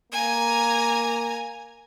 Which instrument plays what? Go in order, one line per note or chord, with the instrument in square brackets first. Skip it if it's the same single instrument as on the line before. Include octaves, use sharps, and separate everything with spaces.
[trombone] A#3 [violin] G#5 A#5